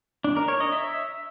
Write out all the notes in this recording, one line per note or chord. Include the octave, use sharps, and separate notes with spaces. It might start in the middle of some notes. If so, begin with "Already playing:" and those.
D4
A#4
C#5
D#5
E5